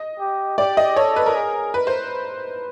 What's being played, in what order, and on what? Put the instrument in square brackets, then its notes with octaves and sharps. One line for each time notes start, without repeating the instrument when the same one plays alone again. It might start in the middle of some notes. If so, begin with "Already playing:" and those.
Already playing: [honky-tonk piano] D#5
[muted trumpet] G4
[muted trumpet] G4 [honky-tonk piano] D5
[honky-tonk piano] D#5
[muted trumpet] A4 [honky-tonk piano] C#5
[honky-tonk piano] B4
A#4
[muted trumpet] G#4
[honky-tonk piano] B4
C5